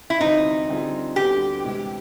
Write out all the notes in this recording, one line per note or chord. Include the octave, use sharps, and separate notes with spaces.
E4
D2 C3 E3 G3 C4 D#4
D3 G3 C4 F4 G#4
D2 D3 G3 B3 G4
C3 E3 G#3